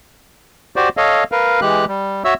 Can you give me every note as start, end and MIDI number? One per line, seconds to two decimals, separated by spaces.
0.76 0.89 66
0.76 0.89 67
0.76 0.89 72
0.76 0.89 74
0.97 1.24 69
0.97 1.24 73
0.97 1.24 75
0.97 1.24 77
1.32 1.60 70
1.32 1.60 71
1.32 1.60 77
1.61 1.85 52
1.61 1.85 56
1.61 1.85 67
1.61 1.85 90
1.88 2.23 55
2.25 2.34 66
2.25 2.34 73
2.25 2.34 76
2.25 2.34 88